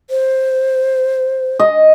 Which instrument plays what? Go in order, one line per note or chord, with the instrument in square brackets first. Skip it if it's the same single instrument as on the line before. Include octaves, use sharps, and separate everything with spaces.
[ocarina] C5
[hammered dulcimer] D#5